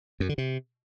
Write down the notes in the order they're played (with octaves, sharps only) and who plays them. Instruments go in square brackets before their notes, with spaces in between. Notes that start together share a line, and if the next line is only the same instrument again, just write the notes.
[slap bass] F#2
D3
C3